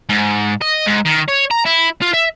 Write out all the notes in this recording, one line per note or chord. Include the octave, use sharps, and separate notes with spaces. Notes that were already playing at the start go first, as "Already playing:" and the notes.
G#2
D#5
G#2
D#3
C#5
A#5
E4
F4
E5